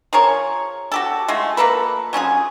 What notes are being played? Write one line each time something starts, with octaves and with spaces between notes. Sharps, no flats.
F3 G#4 A#4 C#5
F#4 G4 A4
G#3 A3 F4 F#4
F3 A#3 A4 B4
F#3 C#4 F4 G#4